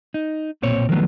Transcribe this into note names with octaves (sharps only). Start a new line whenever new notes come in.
D#4
B1 A#2 C4 C#5
D#3 F3 F#3 A3 B3